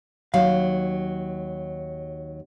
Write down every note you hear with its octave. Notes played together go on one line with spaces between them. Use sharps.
D#2 F#3 F5